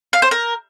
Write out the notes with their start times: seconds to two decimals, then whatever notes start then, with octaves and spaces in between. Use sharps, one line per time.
0.13 F5
0.22 C5
0.31 A#4